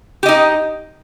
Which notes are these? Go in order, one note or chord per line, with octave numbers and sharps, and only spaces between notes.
D#4 G4 D#5